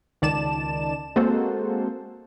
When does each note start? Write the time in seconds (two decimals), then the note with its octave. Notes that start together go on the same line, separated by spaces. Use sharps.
0.22 C#2 D#3 D5 A5 E7
1.16 G#3 A#3 C4 F#4 A4 C5